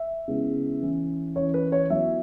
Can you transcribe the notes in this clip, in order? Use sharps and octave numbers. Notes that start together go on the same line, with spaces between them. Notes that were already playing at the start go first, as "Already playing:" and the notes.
Already playing: E5
C#3 G#3 B3 E4
E3 C#4 E4
E3 C#4 E4 C#5
B4
C#5
F#3 B3 E4 E5